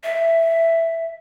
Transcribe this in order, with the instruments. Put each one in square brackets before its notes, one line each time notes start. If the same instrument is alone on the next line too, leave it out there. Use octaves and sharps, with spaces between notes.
[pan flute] E5